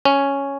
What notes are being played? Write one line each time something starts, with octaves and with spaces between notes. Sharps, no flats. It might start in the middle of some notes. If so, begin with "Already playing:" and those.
C#4